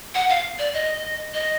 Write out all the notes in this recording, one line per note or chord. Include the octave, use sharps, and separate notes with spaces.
F#5
F5
D5
D#5
D#5